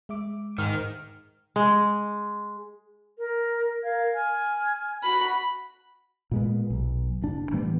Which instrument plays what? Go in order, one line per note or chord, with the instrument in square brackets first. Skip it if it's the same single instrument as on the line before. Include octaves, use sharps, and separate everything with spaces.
[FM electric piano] G#3 E5 D6
[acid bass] G#2 [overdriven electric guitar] D#3 [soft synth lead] F6
[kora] G#3
[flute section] A#4
A#4 F5 G#6
G#5 F6 G#6
[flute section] F#4 [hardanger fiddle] B5
[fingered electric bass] A#2 G#3 B3
B1
F#1 D4
A2 E3 G3 B3